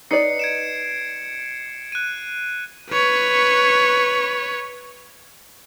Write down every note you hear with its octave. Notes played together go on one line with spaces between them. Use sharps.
D#4 B4 D5 C7 C#7
G#6 D7 E7
F#6 D#7
B4 C#5